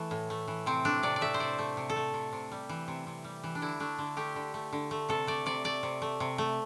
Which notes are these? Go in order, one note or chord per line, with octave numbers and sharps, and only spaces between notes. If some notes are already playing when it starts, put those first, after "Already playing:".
Already playing: E3 A3
A2
A3
E3
C3 C4
A3 D4
C3 D5
D5
A3 E5
C5
C3 D5
A3
C3
A4
A3
C3
C3
G3
E3
C3
C3
G3
E3
D4
D3 E4
A3 D4
D3
A3 G4
D3
A3
D3
A3
C3 A4
A3 D5
C3 D5
A3 D5
C3
A3
C3
A3